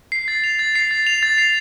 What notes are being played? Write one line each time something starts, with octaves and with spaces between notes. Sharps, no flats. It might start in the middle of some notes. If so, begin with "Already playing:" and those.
C7
A6
F7
A6
C7
A6
F7
A6
C7